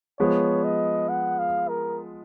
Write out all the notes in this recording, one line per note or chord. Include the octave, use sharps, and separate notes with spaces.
F3 G#3 B3 C#5
D#5
F#5
F5
A#4